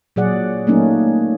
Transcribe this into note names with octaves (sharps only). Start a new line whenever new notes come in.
A#2 F#3 G#4 D5 F#5
F#3 A3 A#3 C#4 D#4